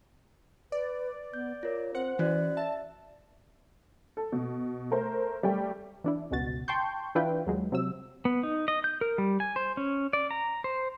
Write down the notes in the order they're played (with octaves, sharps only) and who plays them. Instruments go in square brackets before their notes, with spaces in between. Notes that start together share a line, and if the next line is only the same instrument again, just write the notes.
[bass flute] B4 [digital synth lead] D5
[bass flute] B3 [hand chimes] G6
[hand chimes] F4 A#4 [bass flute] C#5
[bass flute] C4 [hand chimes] C5 [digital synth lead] F#5
[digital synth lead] E3 [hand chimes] C#4 F#4 F#6 [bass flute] D5
[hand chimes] E5 [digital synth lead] A5
[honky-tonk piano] A4
B2
A3 A#4 C5
G3 A3 G5
[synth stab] E3 D4 E4
G1 C#2 B2 F#4 A6
G5 A5 C6 C#6 G6
E3 D4 E4 F4 B4 G5
D#2 F#3 G#3
C3 F#3 E6
[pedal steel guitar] B3
D#4
D#5
G6
A#4
G3
G#5
C5
C#4
D5
A#5
C5